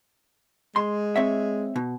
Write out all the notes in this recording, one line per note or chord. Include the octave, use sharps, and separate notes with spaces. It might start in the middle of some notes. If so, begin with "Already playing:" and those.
G#3 C6
C4 C#5 E5
B2